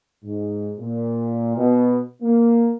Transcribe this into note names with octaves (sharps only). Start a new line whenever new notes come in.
G#2
A#2
B2
A#3